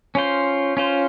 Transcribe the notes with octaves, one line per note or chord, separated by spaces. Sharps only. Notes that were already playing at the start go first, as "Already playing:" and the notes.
C#4 F4 C5
C#4 F4 C5